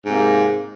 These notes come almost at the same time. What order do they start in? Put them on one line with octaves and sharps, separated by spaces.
G#2 C3 A#3